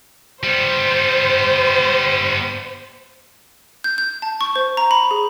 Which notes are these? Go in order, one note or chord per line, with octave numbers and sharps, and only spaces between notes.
G3 B3 C5
G6
G6
A5
C#6
C5
A#5
B5
G#4